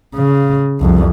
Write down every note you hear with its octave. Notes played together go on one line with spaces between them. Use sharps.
C#3
C2 F2